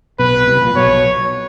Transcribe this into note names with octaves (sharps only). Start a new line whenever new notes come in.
B1 B2 B4
C2 C3
A#1 A#2
B1 B2 C#5